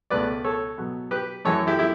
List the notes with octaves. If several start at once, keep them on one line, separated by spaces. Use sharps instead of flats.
C#2 B2 A3 B4 D5
A4 C#5
B2 F#3 B3
G4 B4
F#2 E3 A3 A4 C#5
E4 G4
E4 G4